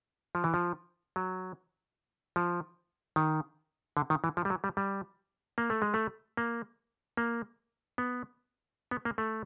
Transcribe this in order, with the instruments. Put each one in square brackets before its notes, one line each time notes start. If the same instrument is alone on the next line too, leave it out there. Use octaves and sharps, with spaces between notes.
[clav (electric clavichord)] F3
E3
F3
F#3
F3
D#3
D3
D#3
E3
F3
G3
F#3
G3
G3
A#3
A3
G#3
A3
A#3
A#3
B3
B3
A#3
A3